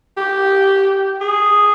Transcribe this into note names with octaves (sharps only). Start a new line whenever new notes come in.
G4
G#4